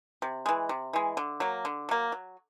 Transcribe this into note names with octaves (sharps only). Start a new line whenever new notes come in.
C3
E3 G#3
C3
E3 G#3
D3
F#3 A#3
D3
F#3 A#3
F#3